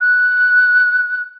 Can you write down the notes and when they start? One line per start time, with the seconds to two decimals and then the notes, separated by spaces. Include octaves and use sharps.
0.01 F#6